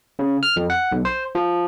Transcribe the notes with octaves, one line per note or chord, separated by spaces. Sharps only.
C#3
F6
F2
F#5
B1
C5
F3